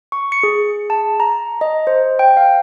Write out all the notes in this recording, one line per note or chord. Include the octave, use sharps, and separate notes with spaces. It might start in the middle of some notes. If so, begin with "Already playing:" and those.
C#6
C#7
G#4
A5
A#5
D#5
C5
G5
F5